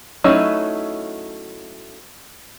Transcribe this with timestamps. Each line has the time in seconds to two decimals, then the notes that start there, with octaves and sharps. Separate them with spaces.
0.24 F#3 A3 C#4 D#4 E4